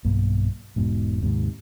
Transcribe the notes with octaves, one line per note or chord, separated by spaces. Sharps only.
B1 G2 A#3
E1 G#2 B2
D#2 G#2 C3